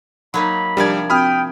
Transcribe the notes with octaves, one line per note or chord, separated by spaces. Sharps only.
F#3 A#3 D#4 B5
C3 F3 G3 D4 A#4 D5 G#6
C4 F#4 G5 B5 D#6 F6